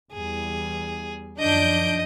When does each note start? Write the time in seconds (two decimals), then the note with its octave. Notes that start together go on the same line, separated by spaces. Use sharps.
0.12 E2 G3 G#4
1.39 F#2 D#3 F3 D4 D#5 G6 D7